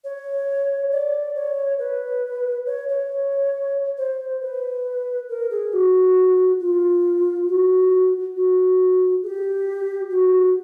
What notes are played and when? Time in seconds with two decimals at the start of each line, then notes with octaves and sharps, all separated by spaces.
0.04 C#5
0.92 D5
1.35 C#5
1.79 B4
2.66 C#5
2.89 C#5
3.98 C5
4.42 B4
5.29 A#4
5.51 G#4
5.73 F#4
6.60 F4
7.48 F#4
8.35 F#4
9.23 G#4
9.27 G4
10.10 F#4